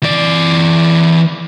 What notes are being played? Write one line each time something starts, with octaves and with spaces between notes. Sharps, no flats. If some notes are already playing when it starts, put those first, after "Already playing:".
E3 D5